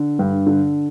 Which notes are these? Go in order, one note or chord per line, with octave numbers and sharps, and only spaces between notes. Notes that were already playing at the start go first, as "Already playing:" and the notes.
Already playing: D3
G2
D3